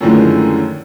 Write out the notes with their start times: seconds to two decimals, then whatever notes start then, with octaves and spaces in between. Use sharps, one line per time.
0.01 F#2 A2 D3 D#3 F3 G#3